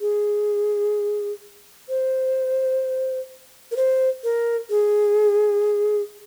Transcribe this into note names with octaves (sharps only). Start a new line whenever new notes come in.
G#4
C5
A#4
C5
A#4
G#4